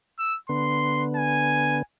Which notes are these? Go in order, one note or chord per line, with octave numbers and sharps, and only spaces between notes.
E6
D3 B3 C6
G#5